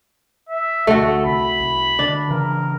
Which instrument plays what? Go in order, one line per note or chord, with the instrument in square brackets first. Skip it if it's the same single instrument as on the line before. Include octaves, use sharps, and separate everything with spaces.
[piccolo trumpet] E5
[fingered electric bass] D2 [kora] A3 F#4 [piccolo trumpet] A4
[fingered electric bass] C2 [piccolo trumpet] B5
[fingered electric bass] C2
[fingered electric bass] D3 [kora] D4
[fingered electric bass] C#3 E3 [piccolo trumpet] A#4